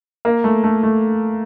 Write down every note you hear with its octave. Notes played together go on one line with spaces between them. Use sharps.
A#3
A3
A3
A3